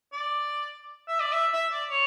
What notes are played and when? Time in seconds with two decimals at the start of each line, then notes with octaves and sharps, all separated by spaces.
0.12 D5
1.08 E5
1.20 D5
1.32 E5
1.53 E5
1.71 D5
1.90 C#5